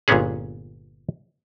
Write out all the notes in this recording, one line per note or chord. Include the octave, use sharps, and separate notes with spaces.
G1 A#2 G#3 B3 C#4 G#4